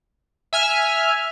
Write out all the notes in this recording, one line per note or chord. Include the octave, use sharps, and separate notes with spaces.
E5 G#5 F6